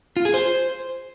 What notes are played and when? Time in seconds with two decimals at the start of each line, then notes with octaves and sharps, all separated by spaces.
0.17 F4
0.25 G#4
0.34 C5